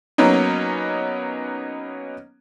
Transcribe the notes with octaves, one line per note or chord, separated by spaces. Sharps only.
F#3 A#3 B3 C#4 D#4